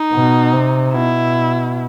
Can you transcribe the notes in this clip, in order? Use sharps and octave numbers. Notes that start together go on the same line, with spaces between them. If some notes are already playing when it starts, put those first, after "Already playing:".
Already playing: D#4
B2
C3
B2 E4